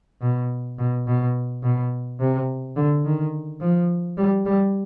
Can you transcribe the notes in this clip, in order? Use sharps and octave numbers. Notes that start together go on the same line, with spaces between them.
B2
B2
B2
B2
C3
D3
D#3
F3
G3
G3